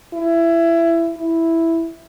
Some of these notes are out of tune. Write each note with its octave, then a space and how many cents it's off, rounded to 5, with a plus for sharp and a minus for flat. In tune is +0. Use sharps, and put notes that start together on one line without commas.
E4 +20
E4 +0